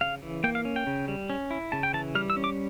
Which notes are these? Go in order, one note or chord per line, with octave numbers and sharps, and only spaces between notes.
C#3 F5
E3
A#3 G5
F5
C#4
G5
C#3
G3
C#4
E4
C#3 A5
G5
E3 A5
G3 F6
E6
C#4
D6